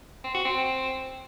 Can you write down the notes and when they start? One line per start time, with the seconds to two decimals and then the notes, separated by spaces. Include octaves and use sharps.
0.24 C4
0.35 F#4
0.45 C4